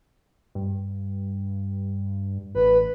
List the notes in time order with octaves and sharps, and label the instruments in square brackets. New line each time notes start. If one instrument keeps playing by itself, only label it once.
[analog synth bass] G2
[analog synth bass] A1 [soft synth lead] B4